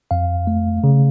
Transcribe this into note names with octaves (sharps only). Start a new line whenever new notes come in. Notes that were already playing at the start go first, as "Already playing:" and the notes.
F2 F5
A3
C#3